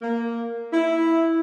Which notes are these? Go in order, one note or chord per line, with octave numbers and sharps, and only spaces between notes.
A#3
E4